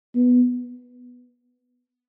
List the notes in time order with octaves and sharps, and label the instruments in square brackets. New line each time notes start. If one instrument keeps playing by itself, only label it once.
[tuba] B3